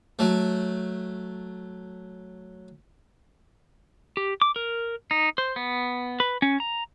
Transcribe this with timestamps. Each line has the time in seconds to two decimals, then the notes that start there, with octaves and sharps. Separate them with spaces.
0.19 F#3 A3
4.17 G4
4.42 D6
4.56 A#4
5.11 D#4
5.38 C5
5.56 B3
6.20 B4
6.42 C#4
6.60 A#5